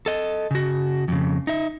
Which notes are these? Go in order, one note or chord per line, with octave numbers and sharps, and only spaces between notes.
A4 D#5
C#3 F#4
F2 C#3
D#4 E5